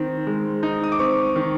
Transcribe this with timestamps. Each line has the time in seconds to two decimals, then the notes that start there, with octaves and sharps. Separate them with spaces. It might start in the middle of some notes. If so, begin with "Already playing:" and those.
Already playing: D#3 C4
0.27 G#3
0.63 D#4
0.84 D#6
0.92 D6
0.99 C4 C#6
1.36 D#3